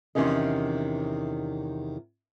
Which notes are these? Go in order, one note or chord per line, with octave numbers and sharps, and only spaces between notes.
E2 C3 D#3 C#4 D#5